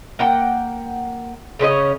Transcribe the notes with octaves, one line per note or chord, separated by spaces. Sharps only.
A#3 F#5 G5
C#3 C#4 C5 D#5